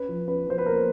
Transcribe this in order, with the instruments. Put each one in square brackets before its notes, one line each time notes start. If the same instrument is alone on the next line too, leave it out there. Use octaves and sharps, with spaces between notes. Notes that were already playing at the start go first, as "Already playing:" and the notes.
Already playing: [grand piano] C#4 B4
F3
C#4 B4
F3 C5
B4
A#3 A#4